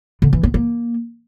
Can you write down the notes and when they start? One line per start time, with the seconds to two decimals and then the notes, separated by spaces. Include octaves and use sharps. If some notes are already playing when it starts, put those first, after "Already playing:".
0.22 D3
0.33 E3
0.43 B3
0.54 A#3